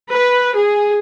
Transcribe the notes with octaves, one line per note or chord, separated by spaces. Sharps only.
B4
G#4